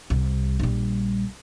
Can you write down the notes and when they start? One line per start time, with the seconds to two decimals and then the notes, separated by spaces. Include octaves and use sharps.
0.10 C2
0.60 A#1 G3